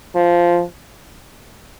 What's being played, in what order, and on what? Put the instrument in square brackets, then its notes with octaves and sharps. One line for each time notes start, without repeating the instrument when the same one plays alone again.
[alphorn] F3